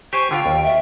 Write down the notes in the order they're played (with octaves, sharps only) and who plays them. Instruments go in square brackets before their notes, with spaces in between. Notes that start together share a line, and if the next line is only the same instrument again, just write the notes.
[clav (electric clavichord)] G4 C5 G#5 [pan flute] C#6
[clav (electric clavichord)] D3 F4 F5 [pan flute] G5
[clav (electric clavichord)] D#2
[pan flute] E5